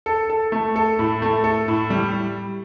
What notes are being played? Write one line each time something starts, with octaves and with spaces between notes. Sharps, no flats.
A4
A4
A3
A4
A2
A3
A4
A2
G3